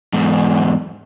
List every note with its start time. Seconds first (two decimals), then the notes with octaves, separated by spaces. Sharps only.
0.13 E2 G#2